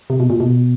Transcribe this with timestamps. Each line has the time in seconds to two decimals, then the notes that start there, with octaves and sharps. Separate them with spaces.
0.10 C3
0.20 B2
0.30 A#2
0.40 B2